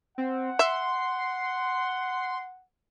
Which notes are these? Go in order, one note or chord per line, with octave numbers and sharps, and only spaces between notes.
C4 F#5
E5 C6